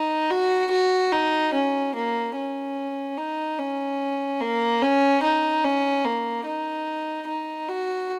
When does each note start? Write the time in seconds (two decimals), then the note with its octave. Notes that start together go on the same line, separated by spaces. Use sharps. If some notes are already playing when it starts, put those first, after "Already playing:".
Already playing: D#4
0.30 F#4
0.71 F#4
1.12 D#4
1.53 C#4
1.95 A#3
2.36 C#4
3.17 D#4
3.58 C#4
4.41 A#3
4.82 C#4
5.23 D#4
5.64 C#4
6.05 A#3
6.45 D#4
7.28 D#4
7.69 F#4